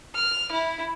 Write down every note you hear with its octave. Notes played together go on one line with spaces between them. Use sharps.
F6
E4